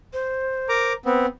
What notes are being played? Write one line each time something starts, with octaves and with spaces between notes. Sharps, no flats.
C5
A#4 A#5 D6
B3 C4